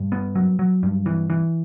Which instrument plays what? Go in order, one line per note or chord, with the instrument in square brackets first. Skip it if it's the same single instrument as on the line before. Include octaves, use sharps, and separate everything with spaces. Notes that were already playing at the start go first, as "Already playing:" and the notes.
Already playing: [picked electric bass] G2
B3
F#3
F#3
G2
E3
E3